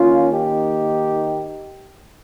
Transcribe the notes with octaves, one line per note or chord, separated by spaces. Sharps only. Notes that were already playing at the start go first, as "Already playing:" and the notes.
Already playing: D#3 A#3 C#4 F4
D#4 G4